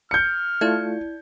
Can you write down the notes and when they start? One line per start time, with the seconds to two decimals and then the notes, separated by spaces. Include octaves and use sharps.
0.11 F6 G6 C#7
0.61 A3 E4 F4 D5 G#6